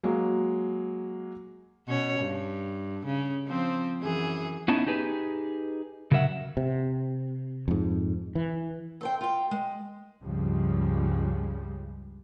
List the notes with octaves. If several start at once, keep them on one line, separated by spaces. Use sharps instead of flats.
F#3 G#3 A#3
B2 C#4 C#5
G2
C#3
F3 C4
F#2 E3 G#4
B3 C#4 D#4 E4 A5
D#4 G4 G#4 B4
C#3 F#3 A#4 E5 F#5
C3
F2 G#2
E3
A4 C5 G5
F4 G5
G#3
C#2 G2 C#3 F3 G3 G#3